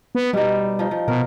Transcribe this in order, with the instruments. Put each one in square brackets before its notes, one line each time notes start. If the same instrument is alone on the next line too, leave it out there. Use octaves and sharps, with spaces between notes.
[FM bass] B3
[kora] B2 D#4 [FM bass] G3
[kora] F3 D#4
F3
[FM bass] B2 [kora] A#4